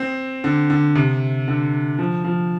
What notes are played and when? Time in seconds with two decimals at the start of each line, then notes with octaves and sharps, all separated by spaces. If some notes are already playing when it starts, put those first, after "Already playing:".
Already playing: C4
0.44 D3
0.70 D3
0.95 C3
1.48 D3
1.99 F3
2.24 F3